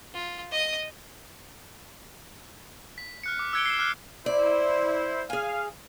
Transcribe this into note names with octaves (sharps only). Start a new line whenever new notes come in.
F4
D#5 D#6
B6
F6 F#6 C#7
D6
E6 F#6 G#6 C#7 D7 G7
C7 E7
D6 F6 F#6 G#6
E4 C5 D5
G#4 F5 G#5